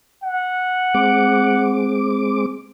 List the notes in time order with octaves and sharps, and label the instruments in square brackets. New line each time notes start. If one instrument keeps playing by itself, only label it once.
[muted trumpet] F#5
[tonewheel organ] G#3 C4 D6